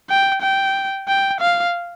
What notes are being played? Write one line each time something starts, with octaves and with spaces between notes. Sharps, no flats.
G5
G5
G5
F5